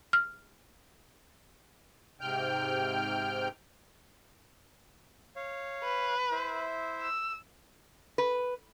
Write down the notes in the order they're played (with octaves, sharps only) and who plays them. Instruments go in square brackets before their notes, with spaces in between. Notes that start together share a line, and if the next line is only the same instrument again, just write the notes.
[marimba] F6
[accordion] G#2 C3 G5 F6 G6
[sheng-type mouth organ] C#5 F5
[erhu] B4
[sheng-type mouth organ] E4 C5 E5
[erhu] E6
[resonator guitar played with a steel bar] B4